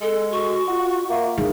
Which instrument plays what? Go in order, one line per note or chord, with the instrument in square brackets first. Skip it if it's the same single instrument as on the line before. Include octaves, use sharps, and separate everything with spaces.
[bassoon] G#3 [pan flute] A4
[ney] F#4 [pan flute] C#6
[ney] F4 [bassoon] F#4
[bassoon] A#3 [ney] E5
[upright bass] D#4 [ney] G#4